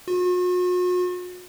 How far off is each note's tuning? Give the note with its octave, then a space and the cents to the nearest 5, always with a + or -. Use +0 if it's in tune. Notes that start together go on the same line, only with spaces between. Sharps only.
F#4 -45